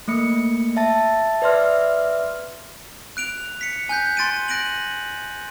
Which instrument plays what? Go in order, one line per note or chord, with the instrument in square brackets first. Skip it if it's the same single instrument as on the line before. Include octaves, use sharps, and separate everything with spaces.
[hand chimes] A3 A#3 C#7
E5 A5 A6
B4 D5 E5 C6 F6
[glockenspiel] F#6 D7 F7
B6 C#7
G#5 F#6 G6 B6
C6 A6 D7 D#7
F#6 A#6 D7 D#7 F#7